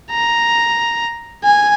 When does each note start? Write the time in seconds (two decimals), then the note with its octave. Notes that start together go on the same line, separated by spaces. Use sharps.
0.11 A#5
1.44 G#5